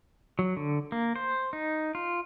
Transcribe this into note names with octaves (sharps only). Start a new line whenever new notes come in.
F#3
D3
A#3
C5
D#4
F4